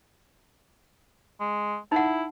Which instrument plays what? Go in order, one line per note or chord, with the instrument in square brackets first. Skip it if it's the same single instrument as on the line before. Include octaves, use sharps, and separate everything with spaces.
[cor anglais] G#3
[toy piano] D#4 F#5 [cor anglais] E4